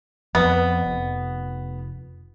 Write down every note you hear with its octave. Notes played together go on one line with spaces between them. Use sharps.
F2 B3
F1